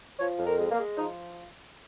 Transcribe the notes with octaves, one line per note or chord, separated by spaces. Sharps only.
F3 C#5
F2
A#4
G#3
A#3
G#3
F3 D#4